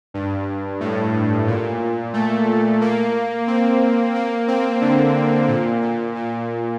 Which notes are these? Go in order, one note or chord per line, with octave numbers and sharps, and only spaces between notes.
G2
A2
A#2
A3
A#3
C4
A#3
C4
D3
A#2
A#2
A#2